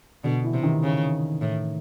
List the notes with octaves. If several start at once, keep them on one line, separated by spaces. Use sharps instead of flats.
B2 D3
E3
C3
D#3
C#3
A2